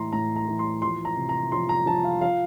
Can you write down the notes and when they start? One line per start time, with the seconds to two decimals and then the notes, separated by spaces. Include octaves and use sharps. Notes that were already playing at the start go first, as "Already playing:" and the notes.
Already playing: A2 E3 A#5 C6
0.12 A2 A#5
0.36 A#5
0.47 E3
0.59 C6
0.82 F3 C6
1.05 A#5
1.17 C3
1.29 A#5
1.52 F3 C6
1.69 A#5
1.86 F3 A5
2.04 F5
2.21 F3 F5